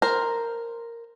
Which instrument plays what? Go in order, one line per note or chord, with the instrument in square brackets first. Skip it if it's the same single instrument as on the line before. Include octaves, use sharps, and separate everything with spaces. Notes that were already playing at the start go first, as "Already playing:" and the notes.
[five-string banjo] A#4 C5